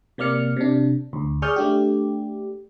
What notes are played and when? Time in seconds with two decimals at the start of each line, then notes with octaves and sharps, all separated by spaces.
0.18 C3 A#3 D5 F6 C#7
0.56 C3 D4
1.13 D2
1.42 G#4 D5 C#6 D#6 F6 G6
1.56 A3 D4 G4